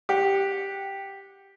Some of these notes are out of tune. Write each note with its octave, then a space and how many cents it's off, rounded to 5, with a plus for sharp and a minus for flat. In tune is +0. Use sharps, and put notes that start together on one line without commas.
G4 +0 F#5 -15